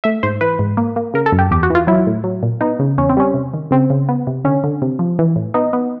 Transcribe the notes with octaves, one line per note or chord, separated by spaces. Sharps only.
A3 E5
G#2 C5
E3 B4
G#2
A#3
A#3
C#3 A#4
A4
F#2
G4
E2 G4
F#4
E3 F4
F#3 E4
A2
F#3
A#2
B3 D#4
C#3
E2 C#4
C4
G3 C#4
C3
D#3
C#3 C4
C#3
B3
C3
D3 C#4
D3
C3
F3
E3
A2
B3 D#4
B3